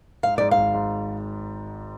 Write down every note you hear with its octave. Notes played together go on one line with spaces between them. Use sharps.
G#2 F5
G#2 D5
F5
G#1
G#2